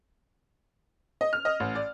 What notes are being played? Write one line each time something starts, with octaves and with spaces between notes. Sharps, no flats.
D#5
F6
D#5
A1
D5